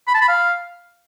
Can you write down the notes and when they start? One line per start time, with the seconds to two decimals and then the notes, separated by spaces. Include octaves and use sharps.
0.07 B5
0.14 A5
0.21 B5
0.28 F5